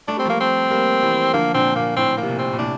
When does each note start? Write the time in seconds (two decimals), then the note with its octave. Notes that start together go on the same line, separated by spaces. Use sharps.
0.08 A3 D4
0.17 G3 C4
0.25 F3 A3 A#3
0.40 C4
0.70 G3 A#3
1.02 E3 G3
1.33 D3 F3 A#3
1.54 A#2 D3 C4
1.75 A#2 A#3
1.96 A2 C4
2.17 A#3
2.22 C3
2.28 A#2
2.39 C4
2.53 A#2
2.58 A2 C3 D4